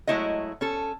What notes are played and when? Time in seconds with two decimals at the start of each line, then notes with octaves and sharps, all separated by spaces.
0.07 F#3 G#3 A3 E4 C#5 D#5
0.61 C#4 A4